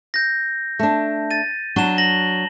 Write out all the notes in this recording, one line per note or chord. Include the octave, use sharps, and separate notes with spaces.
G6 A#6
A3 D4
A6 D#7
F#3 D4 F#4 E7 G7
A5 A#6 F#7